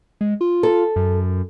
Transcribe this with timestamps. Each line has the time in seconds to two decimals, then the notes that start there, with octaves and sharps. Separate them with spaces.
0.21 G#3
0.41 F4
0.63 A4
0.96 F#2